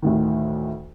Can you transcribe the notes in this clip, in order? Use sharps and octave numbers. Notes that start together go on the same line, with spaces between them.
D2 A2 D#3